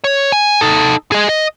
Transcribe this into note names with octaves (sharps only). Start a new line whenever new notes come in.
C#5
G#5
D#4 A4
G#4 D#5
D#5